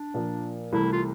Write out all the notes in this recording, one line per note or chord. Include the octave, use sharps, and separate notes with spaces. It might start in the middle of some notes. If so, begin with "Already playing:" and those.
Already playing: D4
A#2 F3 A#3
C2 C3 E3 A3 E4
F4